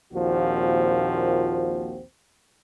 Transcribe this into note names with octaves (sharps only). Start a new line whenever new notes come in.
A#1 D#2 A#2 F3 C4 F#4